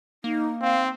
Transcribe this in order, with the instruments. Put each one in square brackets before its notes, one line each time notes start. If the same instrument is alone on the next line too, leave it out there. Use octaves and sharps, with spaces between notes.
[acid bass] A#3 [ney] D#4
[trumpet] C4 [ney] F5